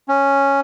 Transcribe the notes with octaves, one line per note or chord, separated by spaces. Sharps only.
C#4